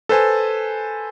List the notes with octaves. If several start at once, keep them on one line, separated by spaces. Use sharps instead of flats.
A4 B4 C5 G#5 A5